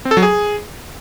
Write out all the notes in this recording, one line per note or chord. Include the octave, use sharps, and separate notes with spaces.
C4
A4
F#3
G#4